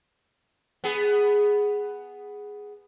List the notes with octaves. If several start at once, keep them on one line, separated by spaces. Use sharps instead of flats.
B3 G#4